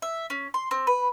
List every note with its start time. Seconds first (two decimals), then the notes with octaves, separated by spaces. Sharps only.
0.02 E5
0.30 C#4
0.54 C6
0.71 C4
0.87 B4